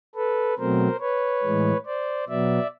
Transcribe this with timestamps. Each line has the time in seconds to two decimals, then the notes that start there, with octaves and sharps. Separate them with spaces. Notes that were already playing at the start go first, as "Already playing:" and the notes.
0.15 A4 B4
0.58 B2 F#3 A3 C4 A#4 C5
1.01 B4 C#5
1.43 A2 E3 G#3
1.86 C5 D5
2.28 B2 F#3 B3 D5 E5